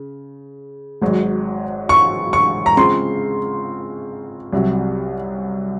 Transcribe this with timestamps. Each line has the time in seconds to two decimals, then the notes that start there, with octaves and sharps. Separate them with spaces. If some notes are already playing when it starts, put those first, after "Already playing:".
Already playing: C#3
1.02 G#1 G#2 F#3
1.89 C#6
2.33 C#6
2.66 A#5
2.77 C#3 G#3 C4 F4 C6
4.53 C2 C3 F#3